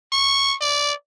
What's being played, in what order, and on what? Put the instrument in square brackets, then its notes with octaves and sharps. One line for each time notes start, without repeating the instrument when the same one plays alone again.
[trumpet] C#6
D5